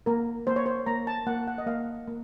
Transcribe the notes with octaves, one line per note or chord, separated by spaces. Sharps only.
A#3 A#4
A#3 C5
C#5
C5
A#3 A#5
A5
A#3 F#5
F#5
D#5
A#3 F5
A#3